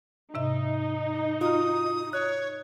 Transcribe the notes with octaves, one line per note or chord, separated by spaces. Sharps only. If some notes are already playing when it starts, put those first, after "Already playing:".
G#2 C3 D#4 E5
F4 F#4 D#6 F6
C#5 F#6